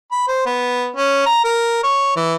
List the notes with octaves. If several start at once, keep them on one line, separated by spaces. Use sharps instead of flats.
B5
C5
B3
C#4
A#5
A#4
C#5
E3